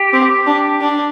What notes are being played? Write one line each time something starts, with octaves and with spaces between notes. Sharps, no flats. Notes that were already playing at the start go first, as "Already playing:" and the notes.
Already playing: G4
C4
D4
D4